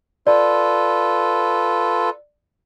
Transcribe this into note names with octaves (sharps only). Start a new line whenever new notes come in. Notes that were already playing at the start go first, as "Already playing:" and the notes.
F4 A4 B4 D5